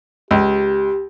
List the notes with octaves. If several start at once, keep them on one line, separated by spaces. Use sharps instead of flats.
C#2 G4